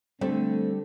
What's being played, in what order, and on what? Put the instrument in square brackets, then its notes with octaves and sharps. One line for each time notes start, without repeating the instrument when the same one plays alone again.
[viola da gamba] D3 [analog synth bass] G3 [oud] A3 [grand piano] C4